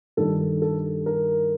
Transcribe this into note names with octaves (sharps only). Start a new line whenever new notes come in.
G2 D#3 G3 A4
A4
A#4